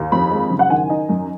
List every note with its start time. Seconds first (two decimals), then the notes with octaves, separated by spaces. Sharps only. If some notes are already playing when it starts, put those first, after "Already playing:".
Already playing: D#2
0.12 F2 B5
0.32 G#3
0.50 F#1
0.59 F#5
0.70 D#3 G#5
0.90 D#4
1.09 F#2